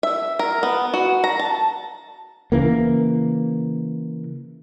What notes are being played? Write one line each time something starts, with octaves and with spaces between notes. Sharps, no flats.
E5
A#4
B3
F#4
A#5
A5
C#3 E3 A#3